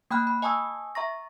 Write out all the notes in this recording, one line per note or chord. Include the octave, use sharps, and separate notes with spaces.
A#3 G5 B5 F6 F#6
B5
D#5 G#5 A5 C#6 D#6 E6
E5 A#5 C#6 A#6